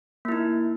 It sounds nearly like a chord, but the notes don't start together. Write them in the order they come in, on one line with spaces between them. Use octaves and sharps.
A#3 E4 D#4